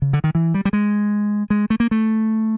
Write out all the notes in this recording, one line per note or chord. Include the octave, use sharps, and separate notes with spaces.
C#3
D3
D#3
E3
G3
G3
G#3
G#3
A3
A#3
A3